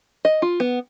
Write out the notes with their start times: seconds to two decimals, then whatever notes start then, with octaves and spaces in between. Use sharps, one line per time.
0.25 D#5
0.42 F4
0.60 B3